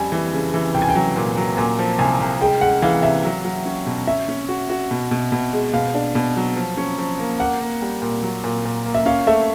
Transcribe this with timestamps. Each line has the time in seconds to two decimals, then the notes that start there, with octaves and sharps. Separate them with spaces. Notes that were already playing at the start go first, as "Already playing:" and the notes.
Already playing: F2 G3 G#5
0.12 E3
0.33 C#3
0.54 E3
0.74 C2 G5
0.82 G#5
0.89 G5
0.95 F#3
1.16 A#2
1.37 F#3
1.57 A#2 G#5
1.79 F3
1.99 C2 G#5
2.20 C2
2.41 G#3 G5
2.61 G#3 F#5
2.82 E3 F5
3.03 C3 E5
3.24 F#3
3.45 F#3
3.65 C#4
3.86 B2
4.07 C#4 E5
4.29 C#4
4.49 F#4
4.70 F#4
4.91 B2
5.11 B2
5.32 B2
5.53 G#3
5.73 B2 F5
5.94 D4
6.15 B2
6.36 F#3
6.56 F3
6.77 C#4
6.98 F3
7.19 A#3
7.40 A#3 F#5
7.61 A#3
7.82 G3
8.02 A#2
8.23 F#3
8.44 A#2
8.65 A#2
8.85 A#3
8.95 E5
9.06 C#4 F5
9.27 A3 E5